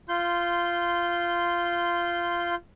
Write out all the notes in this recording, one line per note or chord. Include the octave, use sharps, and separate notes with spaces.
F4 C6 G6